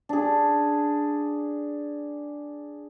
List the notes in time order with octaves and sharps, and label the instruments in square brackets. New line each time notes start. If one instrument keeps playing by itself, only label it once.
[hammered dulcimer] D4 G#4